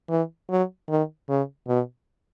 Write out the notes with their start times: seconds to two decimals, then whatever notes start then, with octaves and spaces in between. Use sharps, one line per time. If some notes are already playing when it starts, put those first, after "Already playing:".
0.09 E3
0.50 F#3
0.89 D#3
1.29 C#3
1.68 B2